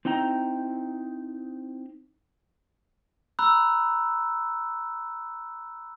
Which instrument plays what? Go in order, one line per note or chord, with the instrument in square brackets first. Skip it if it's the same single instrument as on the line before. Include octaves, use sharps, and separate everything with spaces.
[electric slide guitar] C4 D#4 E4 G5 A#5
[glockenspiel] A#5 B5 E6 F#6